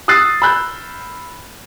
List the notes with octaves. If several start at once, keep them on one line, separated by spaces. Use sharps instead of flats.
D#6 E6 F#6 A6 C7
B5 E6 F#6 G6